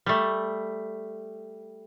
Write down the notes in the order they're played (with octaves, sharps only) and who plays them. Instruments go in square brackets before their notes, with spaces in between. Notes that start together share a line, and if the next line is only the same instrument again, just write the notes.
[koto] G3 A3